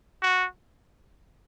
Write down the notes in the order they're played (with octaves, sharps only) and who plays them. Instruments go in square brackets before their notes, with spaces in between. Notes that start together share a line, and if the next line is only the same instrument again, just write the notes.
[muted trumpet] F#4